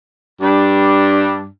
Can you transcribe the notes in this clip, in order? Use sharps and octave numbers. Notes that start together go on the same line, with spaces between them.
G2 D4